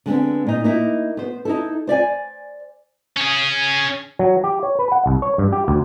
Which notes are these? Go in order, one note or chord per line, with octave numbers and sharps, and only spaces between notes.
D3 G#3 B3 C4
A#2 D#4
A#3 D#4 E4
B3 C5
D#4 E4 A4
C5 D5 E5 G#5
C#4 G#4
F#3
G4
C#5
B4
F#5
C2
C#5
G2
G4
D2